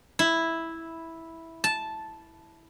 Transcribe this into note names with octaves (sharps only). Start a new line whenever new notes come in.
E4
A5